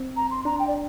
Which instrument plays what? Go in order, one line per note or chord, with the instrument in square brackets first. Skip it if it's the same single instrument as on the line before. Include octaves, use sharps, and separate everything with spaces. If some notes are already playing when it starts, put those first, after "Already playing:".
Already playing: [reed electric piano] C4
[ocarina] A#5
C6
[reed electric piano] D4 [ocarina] A#5
[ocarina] G5
D5